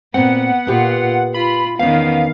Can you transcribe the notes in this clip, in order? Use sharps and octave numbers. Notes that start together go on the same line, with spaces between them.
A#2 B3 C4 F#5
A#2 B3 F4 G4 B4
F4 B5
E2 D#3 B3 C#4 F5